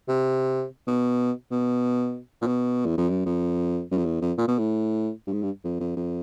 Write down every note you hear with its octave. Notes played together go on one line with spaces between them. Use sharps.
C3
B2
B2
A#2
B2
E2
F2
F#2
F2
F#2
F2
E2
F2
A#2
B2
A2
G2
G#2
G2
F2
F2
F2